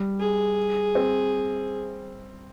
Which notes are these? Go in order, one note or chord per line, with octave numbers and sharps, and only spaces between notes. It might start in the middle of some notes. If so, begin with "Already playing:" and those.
Already playing: G3
G#4
C4